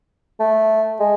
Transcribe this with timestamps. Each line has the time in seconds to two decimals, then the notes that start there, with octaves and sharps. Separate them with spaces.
0.40 A3
1.00 G#3